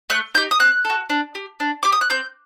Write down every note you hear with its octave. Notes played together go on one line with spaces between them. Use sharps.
A3 F#6
D#4 G4 G6
D#6
C4 F#6
A4
F#4
D4
G4
D4
G4 D6
D#6
F#6
C4 G6